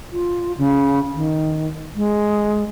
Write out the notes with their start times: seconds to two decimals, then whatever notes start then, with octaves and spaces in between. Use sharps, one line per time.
0.12 F4
0.58 C#3
1.14 D#3
1.95 G#3